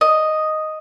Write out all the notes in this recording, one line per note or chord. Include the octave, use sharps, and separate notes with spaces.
D#5